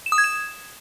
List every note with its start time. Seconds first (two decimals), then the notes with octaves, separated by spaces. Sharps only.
0.06 E7
0.12 D#6
0.18 G#6
0.24 E7